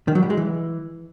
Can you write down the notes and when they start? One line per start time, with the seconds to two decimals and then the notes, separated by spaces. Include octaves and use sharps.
0.08 D#3
0.15 F#3
0.23 G3
0.30 G#3
0.37 E3